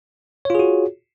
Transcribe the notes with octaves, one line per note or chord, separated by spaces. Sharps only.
F4 F#4 G#4 C#5